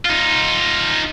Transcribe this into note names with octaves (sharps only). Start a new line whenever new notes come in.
D#4 F4